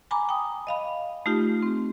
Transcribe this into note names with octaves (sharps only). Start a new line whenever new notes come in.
G#5 A#5 B5 D6
G5 D#6
D#5 F5 B5
A3 D#4 F4 G4
C4